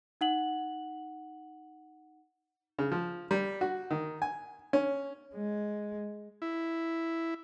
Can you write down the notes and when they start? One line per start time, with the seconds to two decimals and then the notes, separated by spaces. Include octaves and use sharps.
0.21 D#4 F#5 F#7
2.79 C#3
2.92 F3
3.31 G3
3.61 F#4
3.91 D#3
4.22 G#5
4.73 C#4
5.35 G#3
6.42 E4